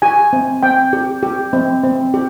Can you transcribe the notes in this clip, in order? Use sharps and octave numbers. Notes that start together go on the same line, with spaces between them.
G4 G#5
C4
C4 G5
G4
G4
C4
C4
G4